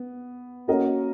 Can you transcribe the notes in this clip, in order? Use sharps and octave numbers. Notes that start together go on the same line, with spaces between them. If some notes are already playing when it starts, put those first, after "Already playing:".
Already playing: B3
A#3 C#4 F#4 A#4 D#5